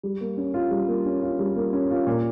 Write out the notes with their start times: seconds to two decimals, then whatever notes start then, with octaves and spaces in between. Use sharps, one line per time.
0.03 G3
0.21 A#3
0.37 C#4
0.54 F4
0.71 G3
0.88 A#3
1.05 C#4
1.23 F4
1.39 G3
1.56 A#3
1.73 C#4
1.91 F4
2.06 A#2